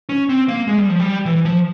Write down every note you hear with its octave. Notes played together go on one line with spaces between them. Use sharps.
C#4
C4
A#3
G#3
G3
F3
G3
E3
F3